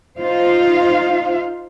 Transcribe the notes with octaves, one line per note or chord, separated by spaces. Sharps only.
D#4 F4 C5 F5